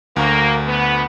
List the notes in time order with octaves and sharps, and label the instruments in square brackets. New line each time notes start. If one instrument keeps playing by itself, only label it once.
[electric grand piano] D2 C#6 [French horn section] A#3
[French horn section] B3